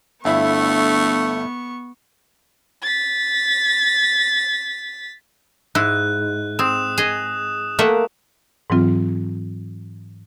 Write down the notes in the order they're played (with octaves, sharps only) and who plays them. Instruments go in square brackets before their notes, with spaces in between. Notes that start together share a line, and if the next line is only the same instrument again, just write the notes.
[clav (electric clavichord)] G1 E4 E5 [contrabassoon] D3 [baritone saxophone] A3 [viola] B3 C#6
[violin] A6 B6
[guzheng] G#2 [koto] E4 [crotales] F#6
[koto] C4 [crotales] D#6 E7
[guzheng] G#4 D#5
[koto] A3 E5 F#5 [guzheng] A#3
[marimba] G#2 E3 F#3 C4 F4